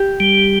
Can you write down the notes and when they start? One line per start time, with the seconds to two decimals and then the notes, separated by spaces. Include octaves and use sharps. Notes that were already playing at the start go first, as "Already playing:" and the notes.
Already playing: G4
0.20 G3